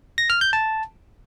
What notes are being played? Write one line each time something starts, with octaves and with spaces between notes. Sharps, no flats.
A#6
F6
G6
A5